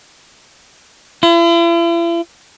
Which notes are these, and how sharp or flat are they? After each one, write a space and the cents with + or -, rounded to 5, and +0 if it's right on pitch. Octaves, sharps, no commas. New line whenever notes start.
E4 +45